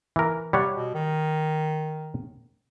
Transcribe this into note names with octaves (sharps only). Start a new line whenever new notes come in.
E3 A#4
C3 G3 C#5 F#5
B2
D#3